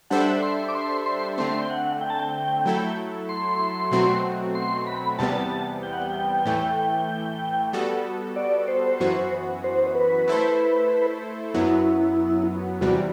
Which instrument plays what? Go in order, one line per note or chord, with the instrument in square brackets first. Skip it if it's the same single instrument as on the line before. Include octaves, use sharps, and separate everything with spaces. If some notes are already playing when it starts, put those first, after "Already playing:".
[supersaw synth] G3 D4 A4 C5 E5 [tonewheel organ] F#5
[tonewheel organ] C6
D6
C6
C6
[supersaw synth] D3 A3 C4 [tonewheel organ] C6
[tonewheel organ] G5
F#5
G5
A5
G5
[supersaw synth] F#3 A3 E4 A4
[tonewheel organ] C6
[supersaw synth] B2 F#3 A3 C4 F#4
[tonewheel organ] C6
B5
[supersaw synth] E2 C3 G3 B3 [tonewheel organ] A5
[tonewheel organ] G5
F#5
G5
[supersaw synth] A2 E3 A3
G3 B3 F#4 A4
[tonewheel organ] D5
C5
[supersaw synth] F#2 E3 B3 F#4
[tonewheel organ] C5
B4
[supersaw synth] A3 E4 A4 C5
[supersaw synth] F#2 F#3 B3 [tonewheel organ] E4
[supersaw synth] E2 C3 G3 [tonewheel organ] F#4